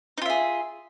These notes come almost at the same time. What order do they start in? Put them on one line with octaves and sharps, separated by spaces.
D#4 F4 E5 G#4